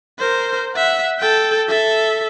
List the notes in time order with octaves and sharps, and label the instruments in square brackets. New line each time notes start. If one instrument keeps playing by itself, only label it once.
[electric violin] A#4 C5
E5 F#5
A4 G5
A4 E5